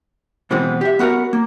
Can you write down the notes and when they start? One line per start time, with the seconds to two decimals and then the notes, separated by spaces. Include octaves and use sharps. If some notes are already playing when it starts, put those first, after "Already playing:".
0.51 B2 E3 G#3 B3 C4
0.81 G4 E5
0.99 B3 F#4 A#4 C#5 F#5
1.33 A#3